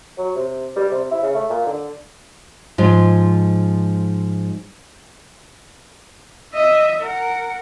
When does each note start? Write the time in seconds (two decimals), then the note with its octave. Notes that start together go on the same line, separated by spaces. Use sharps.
0.18 F#3
0.35 C3
0.76 G3
0.91 C3
1.11 E4
1.22 C#3
1.35 A3
1.49 A#2
1.66 D3
2.78 G#2 F3 G#3
6.54 D#5 E5
7.01 A#4 F#5